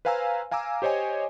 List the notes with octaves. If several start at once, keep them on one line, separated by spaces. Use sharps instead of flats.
B4 C5 F5 G#5 A#5 E6
F5 G#5 A#5 D6 E6
G4 C5 C#5 D#5 G#5